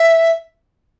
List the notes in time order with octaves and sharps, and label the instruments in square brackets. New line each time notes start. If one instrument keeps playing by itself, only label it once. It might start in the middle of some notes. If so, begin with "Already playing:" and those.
Already playing: [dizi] E5